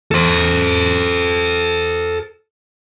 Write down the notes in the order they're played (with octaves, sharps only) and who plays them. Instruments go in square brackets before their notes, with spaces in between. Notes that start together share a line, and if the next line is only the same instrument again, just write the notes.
[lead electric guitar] A4 C5